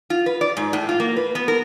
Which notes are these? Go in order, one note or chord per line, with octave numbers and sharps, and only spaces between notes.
F4
B4
D5
G#2
A2
F4
A#3
B4
B3
A#4